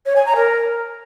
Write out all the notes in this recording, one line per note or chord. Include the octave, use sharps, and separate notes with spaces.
C#5
G#5
A#5
A#4